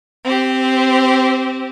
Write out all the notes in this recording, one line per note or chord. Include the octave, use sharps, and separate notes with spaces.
C4 G4